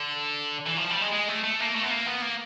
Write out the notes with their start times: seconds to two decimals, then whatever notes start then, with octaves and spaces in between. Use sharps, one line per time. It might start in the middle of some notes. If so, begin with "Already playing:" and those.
Already playing: D3
0.66 E3
0.77 F3
0.90 G3
1.01 G#3
1.12 G#3
1.28 A3
1.44 A3
1.60 A#3
1.76 A3
1.83 B3
1.91 A#3
2.07 B3
2.22 A#3